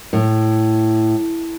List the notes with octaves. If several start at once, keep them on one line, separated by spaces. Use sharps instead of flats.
A2